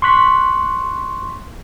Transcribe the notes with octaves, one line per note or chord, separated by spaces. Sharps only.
C6 C#6 F#6 B6